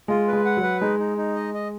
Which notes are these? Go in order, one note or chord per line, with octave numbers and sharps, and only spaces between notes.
G#3 F4
B4
G#3
F#5
F#3
B4
G#3 D#4
D#4
D#4
D#5
D#5